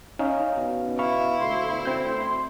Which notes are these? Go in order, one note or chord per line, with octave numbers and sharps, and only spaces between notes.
C#4 D#4 F5
B2
E4 F5 B5 C#6
D2 C6
C4 G6